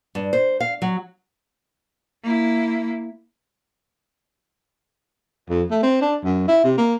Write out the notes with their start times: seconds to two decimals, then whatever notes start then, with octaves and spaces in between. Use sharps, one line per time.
0.15 G2
0.33 C5
0.60 F5
0.82 F#3
2.23 A#3 E4
5.50 F2
5.71 A3
5.83 C4
6.02 D4
6.24 F#2
6.48 E4
6.64 C3
6.78 A#3